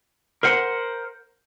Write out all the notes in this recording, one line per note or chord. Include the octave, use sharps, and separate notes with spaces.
A#4 C5 F#5